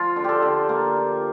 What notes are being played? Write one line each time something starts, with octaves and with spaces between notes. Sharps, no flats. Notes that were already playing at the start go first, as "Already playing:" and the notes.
Already playing: F3 F4
D3
G4 A4
D3
A#3
F3